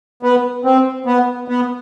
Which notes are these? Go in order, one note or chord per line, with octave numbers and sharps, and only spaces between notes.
B3
C4
B3
B3